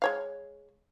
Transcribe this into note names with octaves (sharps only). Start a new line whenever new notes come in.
G#3 C#5 F5